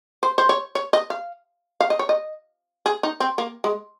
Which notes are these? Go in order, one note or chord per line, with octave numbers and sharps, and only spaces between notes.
C5
C5
C#5
C#5
D#5
F5
F5
D#5
C#5
D#5
G#4
D#4
C4
A#3
G#3